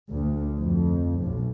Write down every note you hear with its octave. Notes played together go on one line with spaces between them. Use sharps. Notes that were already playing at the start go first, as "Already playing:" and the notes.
D2
F2
B1